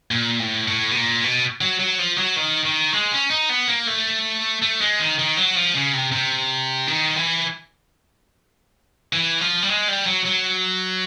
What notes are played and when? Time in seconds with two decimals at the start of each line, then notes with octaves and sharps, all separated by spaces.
0.11 A#2
0.39 A2
0.68 A2
0.91 B2
0.96 A#2
1.24 B2
1.61 F#3
1.80 F#3
1.99 F3
2.18 F#3
2.36 D#3
2.65 D#3
2.93 G#3
3.12 C#4
3.30 D#4
3.49 B3
3.68 A#3
3.87 A3
4.62 A3
4.81 G#3
5.00 D#3
5.19 D#3
5.37 F#3
5.56 F3
5.75 C#3
5.94 C3
6.12 C3
6.87 D#3
7.16 E3
9.13 E3
9.41 F3
9.63 G3
9.69 G#3
9.88 G3
10.06 F#3
10.25 F#3